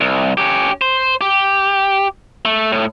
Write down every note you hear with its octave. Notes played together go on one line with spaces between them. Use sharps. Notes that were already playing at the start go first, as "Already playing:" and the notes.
C2
C#4 G4
C5
G4
A3
A2